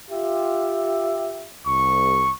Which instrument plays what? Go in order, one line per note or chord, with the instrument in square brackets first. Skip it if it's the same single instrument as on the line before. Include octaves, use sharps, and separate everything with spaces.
[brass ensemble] F4 G4 E5
[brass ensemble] C2 [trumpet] C#6